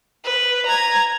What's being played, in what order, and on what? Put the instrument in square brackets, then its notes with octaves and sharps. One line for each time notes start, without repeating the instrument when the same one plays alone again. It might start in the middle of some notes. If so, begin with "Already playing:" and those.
[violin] B4
A#5 G#6